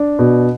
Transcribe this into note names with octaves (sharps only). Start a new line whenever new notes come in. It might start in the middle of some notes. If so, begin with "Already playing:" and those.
Already playing: D4
B2